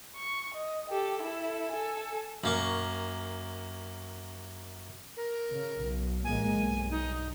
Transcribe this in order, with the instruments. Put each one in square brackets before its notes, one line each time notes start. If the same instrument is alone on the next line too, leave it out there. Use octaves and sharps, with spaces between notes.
[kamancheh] C#6
D#5
G4 A4
E4 A4
A4 G#5
[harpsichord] F#2 A#3 C#6
[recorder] A#4
[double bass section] C#3
B1
[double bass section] A1 G#3 A#3 [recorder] G#5
[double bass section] B1 G2
[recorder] D#4